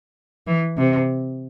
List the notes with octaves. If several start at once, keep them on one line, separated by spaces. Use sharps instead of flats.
E3
C3